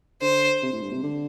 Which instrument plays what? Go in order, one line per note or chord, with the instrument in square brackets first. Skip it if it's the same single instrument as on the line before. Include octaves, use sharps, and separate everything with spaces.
[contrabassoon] D3 [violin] C5
[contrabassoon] C3
A2
G2
C3
D3